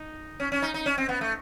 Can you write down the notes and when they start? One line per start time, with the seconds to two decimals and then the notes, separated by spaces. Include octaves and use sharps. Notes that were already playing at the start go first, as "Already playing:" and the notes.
Already playing: D#4
0.40 C#4
0.52 C#4
0.62 D#4
0.74 D#4
0.86 C#4
0.98 C4
1.09 B3
1.21 A3